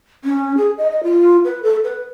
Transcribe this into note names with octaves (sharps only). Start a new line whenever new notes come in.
C#4
G#4
D#5
D#5
F4
B4
A4
B4